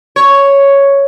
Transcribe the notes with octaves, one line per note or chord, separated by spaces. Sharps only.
C#5